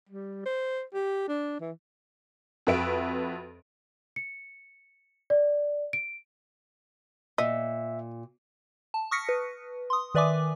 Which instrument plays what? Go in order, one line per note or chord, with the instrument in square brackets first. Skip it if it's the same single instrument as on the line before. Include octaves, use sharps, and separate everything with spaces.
[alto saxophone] G3
C5
G4
D4
E3
[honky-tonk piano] F2 F#4 B4 E5 D7
[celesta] C#7
D5
D7
[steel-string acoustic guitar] A#2 [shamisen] D#5 [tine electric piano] E5
[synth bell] A5
C#6 D#6 F6 A#6 B6 C#7
B4
C6 D#6
D#3 B4 D5 E5 G#5 D6